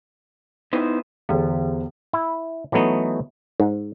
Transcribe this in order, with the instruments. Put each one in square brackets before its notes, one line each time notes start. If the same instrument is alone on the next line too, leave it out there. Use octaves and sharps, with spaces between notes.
[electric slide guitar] B3 E4 C5 [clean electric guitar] D#4
[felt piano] E2 G#4 C5 [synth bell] D3 E3
[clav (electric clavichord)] E4
E3 F#3 A3 B3 D#4
G#2